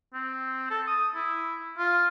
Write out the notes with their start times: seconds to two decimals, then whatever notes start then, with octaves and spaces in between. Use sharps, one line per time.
0.14 C4
0.70 A4
0.87 D#6
1.15 E4
1.78 F4